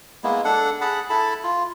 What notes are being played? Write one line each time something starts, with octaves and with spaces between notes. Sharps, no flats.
G#3 A#3 B3 E4
D4 A4 F#5
G#4 F#5 A5 B5
E4 A4 A5 B5
F4